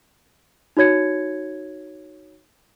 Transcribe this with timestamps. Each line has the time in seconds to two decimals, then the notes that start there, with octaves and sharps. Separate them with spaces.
0.77 D#4 F#4 C#5 G#6 C#7